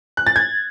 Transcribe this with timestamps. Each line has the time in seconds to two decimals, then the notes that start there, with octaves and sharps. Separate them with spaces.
0.17 F#6
0.27 A6
0.36 G#6